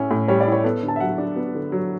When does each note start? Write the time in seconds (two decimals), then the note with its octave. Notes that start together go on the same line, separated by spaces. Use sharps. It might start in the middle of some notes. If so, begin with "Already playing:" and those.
Already playing: A2 C#4 E4
0.11 A2
0.28 G3 C#5
0.41 D5
0.47 E4
0.52 C#5
0.64 B3 A4
0.83 D3
0.88 A5
0.96 E5
1.00 F#3 F#5
1.18 D4
1.36 B3
1.55 D3
1.72 F#3